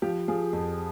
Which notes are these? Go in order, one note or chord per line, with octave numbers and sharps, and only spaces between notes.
F3 G4
F3 G#4
F2